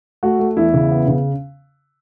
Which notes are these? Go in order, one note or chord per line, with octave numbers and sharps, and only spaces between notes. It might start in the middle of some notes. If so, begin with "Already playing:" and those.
A3 F#4
A3
E2 E4
C#3
B3
C#3